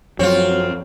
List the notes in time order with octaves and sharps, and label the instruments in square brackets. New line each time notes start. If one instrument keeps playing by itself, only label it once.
[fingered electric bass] F#2 F3 [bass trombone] F#3 [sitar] C4 F4 [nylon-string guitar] C#5